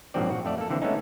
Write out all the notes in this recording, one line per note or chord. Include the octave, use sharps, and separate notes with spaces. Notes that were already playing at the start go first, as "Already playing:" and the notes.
A#1 G#2 F3 F#3 C4 D5
F#4
F2 A3 D5
A#3 A4
D3 E3 C4
G#3 A3 B3 C#4 D#4